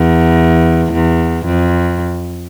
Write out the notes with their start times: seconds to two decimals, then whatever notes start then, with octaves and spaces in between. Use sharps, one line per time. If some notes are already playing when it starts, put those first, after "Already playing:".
Already playing: E2
0.92 E2
1.46 F2